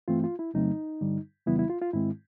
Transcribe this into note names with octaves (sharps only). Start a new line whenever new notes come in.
G2 E3 A3 C4 F4
F4
E4
F2 C#3 F#3 A3 C4 D#4
G2 D3 G3
F2 C#3 E3 G3 B3 E4
E4
F4
F4
G#2 D#3 G#3 C4 E4